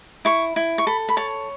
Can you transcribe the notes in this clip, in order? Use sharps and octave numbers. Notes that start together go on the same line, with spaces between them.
E4 C#6
E4
C#6
A4 B5
B5
C#5 A5